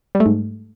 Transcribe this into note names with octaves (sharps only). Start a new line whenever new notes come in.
G3
A3
G#2